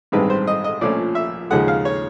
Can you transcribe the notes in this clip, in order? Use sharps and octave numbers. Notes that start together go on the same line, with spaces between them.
A1 G2 D#3 G#3 C4 B4
C5
D#5
D#5
A#1 A#2 F3 A3 C#4 D5
E5
D#2 C#3 F3 G#3 F#5
F5
C#5